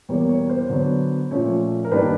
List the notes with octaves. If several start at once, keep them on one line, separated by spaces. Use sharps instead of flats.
E2 B2 G3 A#3 C#5
C#5
C5
D3 F#3 B3
A#2 F3 A3 C#4
A#4
G2 D#3 G3 A#3 D4 B4